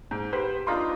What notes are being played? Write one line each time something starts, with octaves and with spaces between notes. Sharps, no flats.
G#2
G4 B4 C5
D4 D#4 F4 A#5 C6 D6